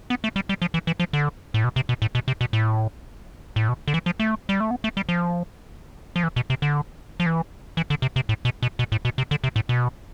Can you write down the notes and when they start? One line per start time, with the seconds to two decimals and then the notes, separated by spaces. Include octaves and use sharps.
0.10 B3
0.24 A3
0.36 G3
0.49 G3
0.62 F3
0.74 E3
0.87 E3
1.00 F3
1.13 D3
1.54 A2
1.64 B2
1.76 C3
1.89 B2
2.02 A2
2.15 B2
2.28 C3
2.41 B2
2.53 A2
3.56 A2
3.69 B2
3.88 D3
3.94 E3
4.06 F3
4.20 A3
4.49 G3
4.60 A3
4.71 B3
4.84 A3
4.97 G3
5.09 F3
6.16 F3
6.23 E3
6.36 B2
6.50 C3
6.62 D3
7.20 F3
7.26 E3
7.77 E3
7.90 D3
8.02 C3
8.16 C3
8.29 A2
8.45 B2
8.63 B2
8.79 B2
8.92 A2
9.05 B2
9.18 C3
9.31 D3
9.44 C3
9.56 A2
9.69 B2